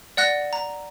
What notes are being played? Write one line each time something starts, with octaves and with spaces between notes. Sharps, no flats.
D5 F#5 F#6 A#6
A#5